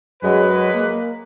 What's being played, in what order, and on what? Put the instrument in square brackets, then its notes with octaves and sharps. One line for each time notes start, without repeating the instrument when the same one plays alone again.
[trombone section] F#2 F#3 [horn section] G#3 B4
[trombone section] A#3